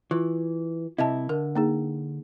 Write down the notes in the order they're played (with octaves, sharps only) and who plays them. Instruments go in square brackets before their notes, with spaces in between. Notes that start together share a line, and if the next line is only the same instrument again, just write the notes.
[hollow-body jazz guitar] E3 [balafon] F4
[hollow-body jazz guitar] C2 C3 E4 [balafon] D#5 E5 A5
[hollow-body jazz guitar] D3 [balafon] A#4
[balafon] A#3 D#4 G#4